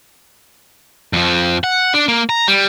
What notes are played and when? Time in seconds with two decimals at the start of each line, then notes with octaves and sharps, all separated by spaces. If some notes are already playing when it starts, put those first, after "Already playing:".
1.13 F2 F3
1.64 F#5
1.94 D4
2.08 A#3
2.29 A#5
2.48 G3